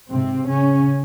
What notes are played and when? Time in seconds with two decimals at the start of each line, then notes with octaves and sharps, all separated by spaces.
0.11 G#2 C3 C4
0.47 C#3 C#4